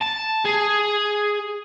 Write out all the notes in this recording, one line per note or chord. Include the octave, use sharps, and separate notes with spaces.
A5
G#4